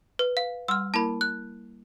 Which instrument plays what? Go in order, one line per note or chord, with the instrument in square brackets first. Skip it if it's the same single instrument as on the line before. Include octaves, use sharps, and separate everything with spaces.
[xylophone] B4
F5
[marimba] G3 F#5 C6 [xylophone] E6 F6
[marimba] A#3 E4 A#4 [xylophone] A5 B5
[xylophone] F#6